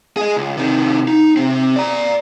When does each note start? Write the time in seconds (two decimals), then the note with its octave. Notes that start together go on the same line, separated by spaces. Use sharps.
0.17 G#4 D#5
0.36 C#2
0.57 C3 D#3
1.08 D#4
1.37 C3 C4
1.76 D5 A#5